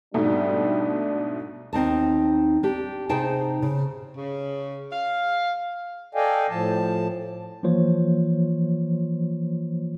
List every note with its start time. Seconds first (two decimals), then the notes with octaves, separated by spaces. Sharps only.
0.14 G#2 B2 G3 A3 D4
1.73 D#2 C4 D#4 A5
2.63 D4 G4
3.09 C3 D#4 G#4 C5 G5 A5
3.62 C#3
4.17 C#3
4.92 F5
6.15 A4 D5 D#5 F5 G5 G#5
6.50 A2 F3 A5
7.63 E3 F3 A#3 F4 C5 C#5